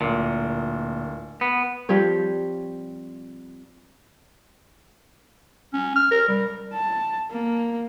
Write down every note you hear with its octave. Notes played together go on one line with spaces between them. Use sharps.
D1 A#2
B3
F3 G3 C4 C#5
C#4
F6
A#4
G3
A5
A#3